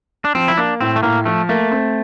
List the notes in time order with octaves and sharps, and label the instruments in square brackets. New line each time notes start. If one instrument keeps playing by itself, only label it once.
[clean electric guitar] D4
[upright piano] F3 [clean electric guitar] C4
[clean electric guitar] E4
[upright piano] A#3 [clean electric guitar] D4
[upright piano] A2 [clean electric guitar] C4
[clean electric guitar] A3
[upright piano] A2 [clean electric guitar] A#3
[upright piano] F3 [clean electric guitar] A3
[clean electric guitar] A3 [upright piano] A#3
[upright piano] C4